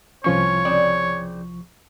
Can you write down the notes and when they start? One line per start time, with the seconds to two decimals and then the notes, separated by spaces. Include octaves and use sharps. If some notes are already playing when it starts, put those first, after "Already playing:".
0.24 C2 F3 C#4 F4 C#5 C#6
0.65 C#3 C4 D5